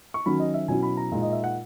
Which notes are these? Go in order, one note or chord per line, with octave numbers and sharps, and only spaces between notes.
C#6
D#3 F#3 C#4 B5
D#5
E5
B2 F#3 C#4 E4 G#5
B5
A#5
A#2 G#3 D#4
D#5
E5
F#5